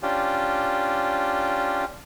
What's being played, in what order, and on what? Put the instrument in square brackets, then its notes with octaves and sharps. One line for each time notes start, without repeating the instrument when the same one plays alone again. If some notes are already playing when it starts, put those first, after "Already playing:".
[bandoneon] C#4 D4 F4 G4